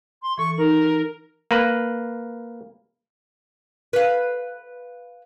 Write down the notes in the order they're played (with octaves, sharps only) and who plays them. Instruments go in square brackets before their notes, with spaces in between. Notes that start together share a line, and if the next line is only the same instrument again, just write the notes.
[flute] C6
[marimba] E3 A4 [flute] C#6
[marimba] D#4 [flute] A#4
[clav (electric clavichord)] A#3 B4
[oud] B4 F5